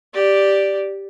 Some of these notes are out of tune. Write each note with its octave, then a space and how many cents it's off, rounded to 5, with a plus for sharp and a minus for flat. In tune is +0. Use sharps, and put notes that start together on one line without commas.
G4 +0 D5 +0